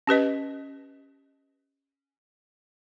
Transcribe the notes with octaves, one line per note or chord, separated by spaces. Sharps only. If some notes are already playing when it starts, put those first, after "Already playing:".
C#4 G4 B4 D#5